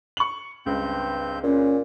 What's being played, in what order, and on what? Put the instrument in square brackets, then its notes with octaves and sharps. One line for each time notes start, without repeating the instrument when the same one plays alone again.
[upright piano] C#6 F#7
[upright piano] C#2 [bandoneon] G2 C4 G6
[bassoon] A#2 [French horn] C#4